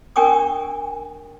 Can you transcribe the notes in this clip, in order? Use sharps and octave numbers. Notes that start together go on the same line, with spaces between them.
D4 A#4 G5 G#5 C#6 D#6